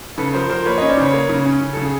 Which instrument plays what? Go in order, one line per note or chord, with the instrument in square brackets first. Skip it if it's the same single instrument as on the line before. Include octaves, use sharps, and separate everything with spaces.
[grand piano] C#3 A4 B4
F3 A#4 C5
F3 A#4 C5
A#3 B4 C#5
C#4 C#5 D#5
C5 D5
C#3 B4 C#5
A#3
C#3
C#4
C#3
C#3 A4
G#4